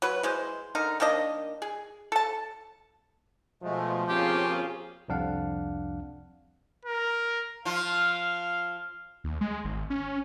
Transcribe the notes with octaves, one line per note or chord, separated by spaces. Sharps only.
F#3 B4
E3 G#3 C5
D3 D#4 A#4
D#3 A#3 D4 D#5
G#4
A4 A5
B2 F3 G#3 A3
A#3 C4 C#4 F4 G4 G#4
C2 F2 D4 F5 F#5
A#4
F3 F4 F5
D#2
G#3
G#1
C#4